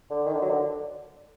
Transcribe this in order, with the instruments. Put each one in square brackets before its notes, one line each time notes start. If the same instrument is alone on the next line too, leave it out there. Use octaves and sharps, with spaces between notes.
[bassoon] D3
D#3
D3
F#3
D3